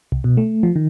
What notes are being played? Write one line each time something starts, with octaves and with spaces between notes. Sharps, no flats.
C2
B2
A3
F3
D#3